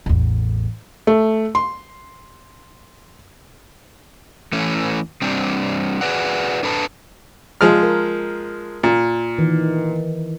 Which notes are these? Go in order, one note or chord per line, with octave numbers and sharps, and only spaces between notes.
A1 E2
A3
C6
E3 A3 C#4
G3 C4 D4
F#4 G#4 A4 B4 D5 F#5
D4 A4 B4 A5
F3 G#3 F6
A#4
A#2
D#3 E3